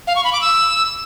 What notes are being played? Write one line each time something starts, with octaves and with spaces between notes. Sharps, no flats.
F5
C#6
B5
D6
E6